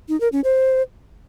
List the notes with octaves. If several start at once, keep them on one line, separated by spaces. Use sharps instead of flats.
D#4
A#4
C#4
C5